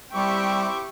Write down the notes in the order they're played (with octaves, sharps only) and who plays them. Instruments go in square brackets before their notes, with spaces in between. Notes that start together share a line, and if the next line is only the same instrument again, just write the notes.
[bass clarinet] G3 [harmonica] C4 E4 D6 [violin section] G4 C#6 [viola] E5 G5